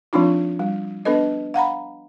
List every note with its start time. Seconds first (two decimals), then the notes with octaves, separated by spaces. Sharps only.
0.13 F3 G#3 C4 D4 D#4 F4
0.59 G3
1.05 B3 D4 A4 B4 D#5
1.54 F5 F#5 A#5 B5